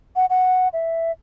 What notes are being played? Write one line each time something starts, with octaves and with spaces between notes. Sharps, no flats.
F#5
F#5
E5